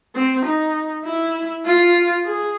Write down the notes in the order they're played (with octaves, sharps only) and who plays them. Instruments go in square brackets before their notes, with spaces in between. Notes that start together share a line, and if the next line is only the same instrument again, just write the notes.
[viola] C4
D#4
E4
F4
G#4